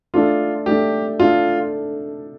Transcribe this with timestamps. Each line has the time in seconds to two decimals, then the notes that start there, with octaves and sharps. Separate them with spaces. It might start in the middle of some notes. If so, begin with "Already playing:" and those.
0.14 A3 D4 F4 A4
0.66 A3 D4 G4 A4
1.19 A3 D4 F4 A4